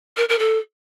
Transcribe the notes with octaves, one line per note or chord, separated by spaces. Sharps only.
A#4
A#4
A4